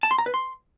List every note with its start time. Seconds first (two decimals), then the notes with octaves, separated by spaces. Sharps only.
0.03 A5
0.11 C6
0.18 A#5
0.26 B4
0.34 C6